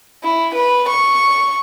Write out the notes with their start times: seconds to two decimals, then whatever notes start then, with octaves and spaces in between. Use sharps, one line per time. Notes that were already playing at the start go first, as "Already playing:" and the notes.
0.23 E4
0.55 B4
0.89 C#6